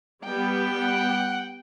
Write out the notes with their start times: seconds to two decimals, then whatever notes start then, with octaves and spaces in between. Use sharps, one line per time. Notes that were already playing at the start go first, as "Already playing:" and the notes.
0.24 G3 B3 G5
0.79 F#5